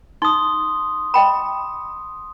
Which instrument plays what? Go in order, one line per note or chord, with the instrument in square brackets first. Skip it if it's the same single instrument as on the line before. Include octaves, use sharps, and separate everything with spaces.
[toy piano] D#4 [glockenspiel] C6 D#6
[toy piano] D#5 G5 B5